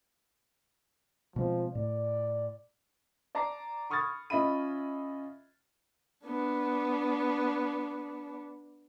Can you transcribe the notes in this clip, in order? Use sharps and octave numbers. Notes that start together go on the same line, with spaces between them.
B2 F3 G#3 C4
A2 D5
D5 A5 A#5 D6 C7
B5 C#6 D#6 F6 G#6 A6
C#4 F4 D#5 E5 B5 D#7
B3 D4